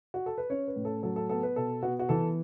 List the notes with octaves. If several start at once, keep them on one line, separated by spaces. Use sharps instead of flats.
F#4
A4
B4
C#4 C#5
B4
A2
A4
F#3 A4
A4
B3 A4
B4
B2 A4
B3 F#4
F#4
E3 A4